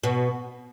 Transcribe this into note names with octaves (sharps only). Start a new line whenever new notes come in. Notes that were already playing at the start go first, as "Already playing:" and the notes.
B2